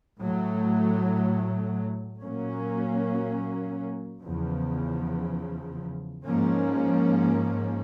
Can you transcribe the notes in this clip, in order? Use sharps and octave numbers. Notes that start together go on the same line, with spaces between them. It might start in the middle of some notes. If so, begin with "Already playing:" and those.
A2 F#3 A3
A#2 F#3 A#3 C#4
E2 C#3 F3
G#2 F3 A#3 C#4